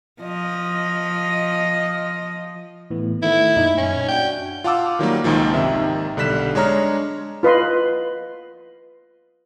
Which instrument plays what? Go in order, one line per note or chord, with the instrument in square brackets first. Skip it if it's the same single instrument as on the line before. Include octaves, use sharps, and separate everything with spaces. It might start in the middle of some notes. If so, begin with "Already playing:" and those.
[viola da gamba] F3 D#5
[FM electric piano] A2 E3 B3
[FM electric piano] D#3 A3 [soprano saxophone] E4
[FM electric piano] F#2 A#2 D#4
[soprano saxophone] C#4
[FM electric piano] D4 F#4 [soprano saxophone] G5
[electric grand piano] F4 F5 F#5 A5 D6 E6
D#3 F#3 G3 A#3
C#2 A#2 D#3 F3
G#1 C3 D#3 E5
B1 D3 G3 F#6 B6 E7
G#3 D4 C#5 A#5 F6
[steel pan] F4 B4 D#5 C6